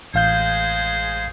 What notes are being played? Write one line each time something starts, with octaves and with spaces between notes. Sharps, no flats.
A1 G#3 G#4 C5 F5 G6